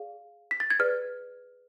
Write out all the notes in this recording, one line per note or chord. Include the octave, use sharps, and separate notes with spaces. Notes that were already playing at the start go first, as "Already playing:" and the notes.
Already playing: G#4 D5 F5
B6
A6
G#6
G#4 B4 D5 F6